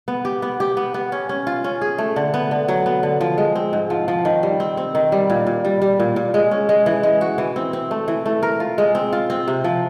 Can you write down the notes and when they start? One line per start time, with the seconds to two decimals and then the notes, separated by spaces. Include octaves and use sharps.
0.08 B3
0.25 G4
0.42 B3
0.60 G4
0.77 B3
0.94 B3
1.12 C#4
1.29 C#4
1.47 F4
1.64 C#4
1.81 G#4
1.98 A3
2.16 D3
2.34 B3
2.51 D3
2.68 F#3
2.86 B3
3.03 D3
3.21 F3
3.38 G#3
3.56 C4
3.73 G#2
3.90 F3
4.08 F3
4.25 D#3
4.43 G3
4.60 C4
4.77 C4
4.95 D#3
5.12 G3
5.30 A#2
5.47 A#2
5.65 G3
5.82 G3
6.00 A#2
6.16 A#2
6.34 G#3
6.51 C#4
6.69 G#3
6.86 E3
7.03 G#3
7.21 F#4
7.38 E3
7.56 C4
7.73 C4
7.91 A3
8.08 E3
8.26 A3
8.43 A#4
8.60 F4
8.78 G#3
8.95 C4
9.13 F4
9.30 C4
9.48 C3
9.64 F3